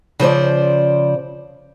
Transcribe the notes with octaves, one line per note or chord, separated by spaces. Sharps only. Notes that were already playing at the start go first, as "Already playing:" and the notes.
C#3 F3 C5 D5